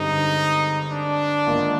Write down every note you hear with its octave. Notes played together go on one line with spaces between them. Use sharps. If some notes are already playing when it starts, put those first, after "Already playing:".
Already playing: G2 D3 G#3 C4 D#4 G4
D4
G#2 D#3 A#3 F4